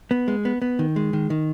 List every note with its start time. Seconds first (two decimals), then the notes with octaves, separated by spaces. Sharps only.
0.11 B3
0.28 G#3
0.45 B3
0.62 B3
0.79 D#3
0.96 G#3
1.13 D#3
1.30 D#3